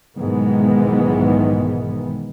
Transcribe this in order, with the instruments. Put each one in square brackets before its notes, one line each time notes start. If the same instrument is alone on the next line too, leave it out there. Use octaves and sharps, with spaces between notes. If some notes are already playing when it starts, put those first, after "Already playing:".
[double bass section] B1 G#2 D#3 E3 G#3 B3